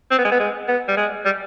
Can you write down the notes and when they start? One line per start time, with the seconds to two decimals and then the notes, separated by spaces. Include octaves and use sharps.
0.11 C4
0.18 B3
0.25 G#3
0.31 B3
0.40 G#3
0.68 B3
0.88 G3
0.97 G#3
1.25 G3